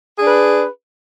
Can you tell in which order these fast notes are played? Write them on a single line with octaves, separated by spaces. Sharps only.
G#4 D4 B4